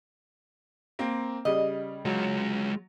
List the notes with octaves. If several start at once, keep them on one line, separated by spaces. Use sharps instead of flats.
A#3 C4
C#3 G3 D#5
F#3 G#3 F4